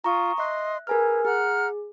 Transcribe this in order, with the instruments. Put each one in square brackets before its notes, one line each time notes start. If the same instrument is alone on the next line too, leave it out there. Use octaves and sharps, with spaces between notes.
[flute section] F4 [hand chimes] A#5 C#6 D#6
[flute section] D#5 C6 [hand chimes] E5 F#6
[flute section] G#4 B4 A#5 [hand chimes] A#4 G#5 F6
[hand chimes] G#4 [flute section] F#5 A#5 F6